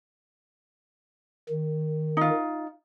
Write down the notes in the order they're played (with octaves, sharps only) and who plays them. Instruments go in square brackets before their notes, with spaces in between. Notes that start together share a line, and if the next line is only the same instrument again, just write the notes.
[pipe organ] D#3
[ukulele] D#4 F4